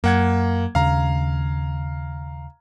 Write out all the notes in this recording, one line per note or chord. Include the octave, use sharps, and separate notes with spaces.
F#2 A#3 F#5 G#6
D#2 C#3 F5 A#5